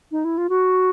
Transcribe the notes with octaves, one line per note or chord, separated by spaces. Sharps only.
D#4
E4
F4
F#4